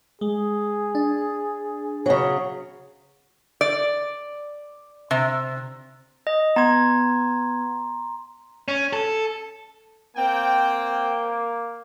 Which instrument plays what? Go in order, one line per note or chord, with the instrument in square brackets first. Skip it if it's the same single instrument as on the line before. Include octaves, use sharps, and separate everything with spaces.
[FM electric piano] G#3 [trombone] G#4
[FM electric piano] D4
[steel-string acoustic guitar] C#3 F#3
[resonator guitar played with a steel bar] D5
C3
[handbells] D#5
[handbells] B3 G#6 [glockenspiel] A#5 C6
[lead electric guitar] C#4
A4
[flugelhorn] A#3 [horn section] C4 G5